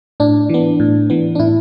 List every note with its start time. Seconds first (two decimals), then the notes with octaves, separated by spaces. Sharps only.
0.20 A2 D4
0.49 E3 B3
0.80 A2
1.10 E3 B3
1.35 D4
1.39 A2 E4